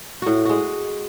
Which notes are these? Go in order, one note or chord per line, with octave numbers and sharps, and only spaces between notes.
A2 F#4
G#3 F#4